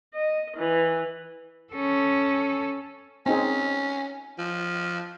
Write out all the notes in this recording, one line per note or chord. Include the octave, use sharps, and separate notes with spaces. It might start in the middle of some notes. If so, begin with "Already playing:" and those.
D#5
E3
C#4 A4
C4 C#4 D#4 G#4
F3